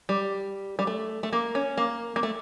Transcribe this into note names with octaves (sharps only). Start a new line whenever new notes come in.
G3
G3
A3
A3
A#3
C#4
A#3
A#3
A3